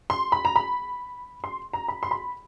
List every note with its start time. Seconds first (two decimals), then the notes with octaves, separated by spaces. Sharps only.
0.10 C6
0.32 B5
0.45 A#5
0.56 B5
1.44 C6
1.73 A#5
1.88 B5
2.03 C6
2.11 B5